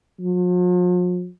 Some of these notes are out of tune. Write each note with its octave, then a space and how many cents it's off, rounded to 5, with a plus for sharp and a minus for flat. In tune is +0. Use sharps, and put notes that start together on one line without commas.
F3 +45